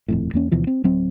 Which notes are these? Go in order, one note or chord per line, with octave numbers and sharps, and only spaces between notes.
D#1 F2 A2
E2 A#3 C#4
D2 B2 E3 F3
C4
D1 F#3 C4